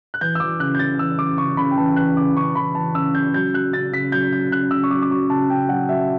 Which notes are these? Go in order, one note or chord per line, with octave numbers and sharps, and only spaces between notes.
F#6
E3 G6
E6
E3 D6
C#3 F#6
G6
C#3 A6
E3 E6
E3 D6
C#3 C#6
C#3 B5
G5
E3 A5
E3 F#6
C#3 D6
C#3 C#6
E3 B5
E3 A5
C#3 E6
C#3 G6
F#3 G6
F#3 F#6
C#3 A6
C#3 B6
F#3 G6
F#3 G6
C#3 F#6
C#3 E6
C#6
F#3 D6
D6
F#3 C#6
C#3 A5
C#3 G5
F#3 F#5
F#3 E5